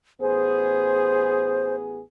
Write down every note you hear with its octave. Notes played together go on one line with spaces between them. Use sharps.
A1 B3 G#4 C5